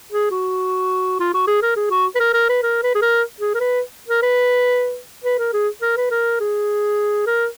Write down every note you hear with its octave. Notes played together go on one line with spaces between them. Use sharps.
G#4
F#4
F4
F#4
G#4
A#4
G#4
F#4
B4
A#4
A#4
B4
A#4
B4
G#4
A#4
G#4
A#4
B4
A#4
B4
B4
A#4
G#4
A#4
B4
A#4
G#4
A#4